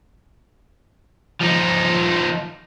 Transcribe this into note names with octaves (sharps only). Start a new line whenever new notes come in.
F3 D#4